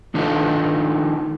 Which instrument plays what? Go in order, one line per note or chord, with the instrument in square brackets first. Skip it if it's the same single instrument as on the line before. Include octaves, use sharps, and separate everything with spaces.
[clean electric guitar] D#3 D4 D#4 F4 A4